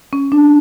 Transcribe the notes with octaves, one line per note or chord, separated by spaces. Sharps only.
C#4
D4